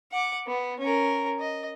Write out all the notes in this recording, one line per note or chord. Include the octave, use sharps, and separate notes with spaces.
F#5 D6
B3
C#4 A#4
D#5